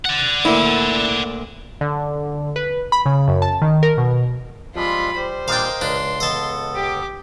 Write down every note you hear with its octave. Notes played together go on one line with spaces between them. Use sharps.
D5 F#5
D2 A#2 D3 E4
D3
B4
B5
C#3
F#2
A5
D#3
A#4
B2
F3 G3 G#3 C4 F4 B5
G3 C5
A#2 G3 D4 A#4 D#5 F5 G5
C#2 D4 B4 C6
B3 A4 D#5 A5
G4 D6